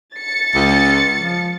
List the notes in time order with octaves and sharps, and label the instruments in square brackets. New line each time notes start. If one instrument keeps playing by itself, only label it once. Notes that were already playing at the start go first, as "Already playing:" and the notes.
[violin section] A6 C#7
[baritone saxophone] C#2
F3